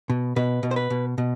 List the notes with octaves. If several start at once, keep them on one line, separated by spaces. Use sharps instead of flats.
B2
B2 B4
B2
C5
B4
B2
B2